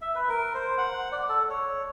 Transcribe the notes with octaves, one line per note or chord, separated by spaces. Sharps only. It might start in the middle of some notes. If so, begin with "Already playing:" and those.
E5
B4
A#4
C5
F#5
D5
A4
C#5